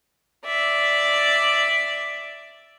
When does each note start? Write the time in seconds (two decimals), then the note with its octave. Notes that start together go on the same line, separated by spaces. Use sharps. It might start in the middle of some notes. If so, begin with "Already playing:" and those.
0.46 D5 E5